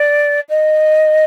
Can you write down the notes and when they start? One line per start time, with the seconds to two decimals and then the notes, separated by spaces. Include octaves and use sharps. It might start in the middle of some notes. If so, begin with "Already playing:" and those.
Already playing: D5
0.49 D#5